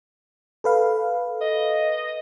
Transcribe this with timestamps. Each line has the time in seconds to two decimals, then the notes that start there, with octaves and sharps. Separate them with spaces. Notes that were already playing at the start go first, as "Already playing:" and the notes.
0.64 A4 B4 F5
1.41 D#5